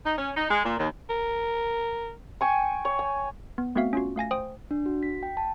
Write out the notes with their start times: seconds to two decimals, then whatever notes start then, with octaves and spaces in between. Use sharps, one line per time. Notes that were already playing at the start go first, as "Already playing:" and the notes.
0.05 D#4
0.18 C#4
0.36 D#4
0.50 G#3
0.65 A#2
0.78 D#2
1.10 A#4
2.41 G5 G#5 C#6
2.85 C#5
2.99 G#5
3.58 B3
3.75 A3 B3 C4 F#4 E5 F5
3.93 C#4 F4 F#4
4.16 A3 F5 G#5 A#6
4.31 C5 G5 D#6
4.71 D4
4.86 F#4
5.03 B6
5.23 G5
5.37 A5